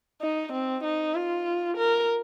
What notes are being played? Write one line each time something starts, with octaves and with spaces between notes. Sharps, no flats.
D#4
C4
D#4
F4
A#4